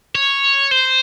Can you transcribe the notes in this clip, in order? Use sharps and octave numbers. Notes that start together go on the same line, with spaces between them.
C#5
C5